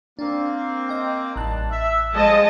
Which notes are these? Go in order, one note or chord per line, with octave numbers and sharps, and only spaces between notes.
A#3 C4 D4
D#5 G5
A1 G3 D#4 A5 F#6
E5
F3 G#3 D#5 A5